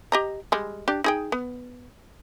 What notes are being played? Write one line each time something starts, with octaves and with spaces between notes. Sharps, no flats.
G4 D#5 A#5
G3 G#3
D4 G4 D5
D#4 G#4 G5
B3